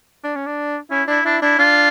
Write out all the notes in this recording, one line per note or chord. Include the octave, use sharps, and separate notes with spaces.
D4
C#4
D4
C#4 E4
D4 E4
D4 E4
D4 E4
D4 F4